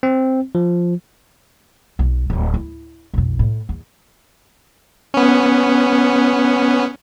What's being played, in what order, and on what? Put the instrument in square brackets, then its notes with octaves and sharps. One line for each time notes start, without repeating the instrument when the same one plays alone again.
[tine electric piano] C4
F3
[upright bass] B1
D1 C4
E4
B1 F2
A2
E2
[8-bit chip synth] B3 C#4